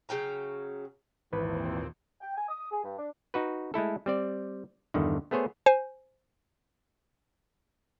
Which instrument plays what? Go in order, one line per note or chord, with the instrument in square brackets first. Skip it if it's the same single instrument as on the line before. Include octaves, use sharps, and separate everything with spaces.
[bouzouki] C#3 F#3 G5 A#5
[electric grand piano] G#1 [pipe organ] D#2 A#2 C4 [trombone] E3 [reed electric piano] B4
[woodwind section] G5
G#5
D#6
G#4
G2
D4
[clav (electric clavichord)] D#4 F#4 B4
G#3 A3 E4 A4
G3 C4 D5
E2 G2 D3 D#3
A3 B3 G#4 C5 C#5
[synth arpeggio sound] C5 G#5